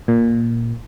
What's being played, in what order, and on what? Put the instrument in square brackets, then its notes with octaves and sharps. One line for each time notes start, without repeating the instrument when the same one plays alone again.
[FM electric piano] A#2